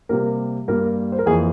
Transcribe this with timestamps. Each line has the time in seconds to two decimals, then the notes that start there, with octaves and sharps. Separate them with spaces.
0.09 C3 G3 A#3 A#4
0.68 G2 G3 A#3 A#4
1.12 C5
1.19 A#4
1.26 F2 E3 A#3 G#4